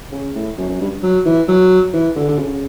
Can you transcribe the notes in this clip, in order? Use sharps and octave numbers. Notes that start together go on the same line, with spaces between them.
C#3
A2
F#2
F#2
G2
F#3
E3
F#3
E3
D3
D3
C#3